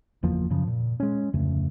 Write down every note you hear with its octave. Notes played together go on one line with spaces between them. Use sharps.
F#1 E2 F3 A#3
F#2 C#3 F3
A#2
G#3 C#4
D1 F2 C#3 A3